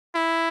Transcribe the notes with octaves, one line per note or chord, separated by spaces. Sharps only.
E4